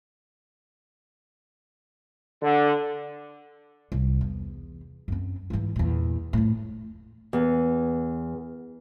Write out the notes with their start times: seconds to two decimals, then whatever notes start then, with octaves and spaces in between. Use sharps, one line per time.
2.42 D3
3.92 C2
4.21 E2
5.08 F#2 C4
5.50 G#2 E3
5.76 E2 A#2
6.33 F2 A2
7.33 E2